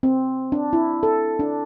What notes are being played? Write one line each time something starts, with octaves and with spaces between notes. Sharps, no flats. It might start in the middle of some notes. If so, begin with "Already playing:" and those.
C4
D4
E4
A4
D4